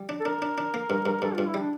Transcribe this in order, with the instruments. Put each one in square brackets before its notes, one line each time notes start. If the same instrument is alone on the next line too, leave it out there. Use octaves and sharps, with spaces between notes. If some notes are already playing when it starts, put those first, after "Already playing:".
Already playing: [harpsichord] G3
D4
[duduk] A4
[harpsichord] D4 [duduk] A#4
[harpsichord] D4
D4
A#3
G2
G2
[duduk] A#4
[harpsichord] G2 [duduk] A4
[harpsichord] G2 [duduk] F4
[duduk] E4
[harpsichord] G3 [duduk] D4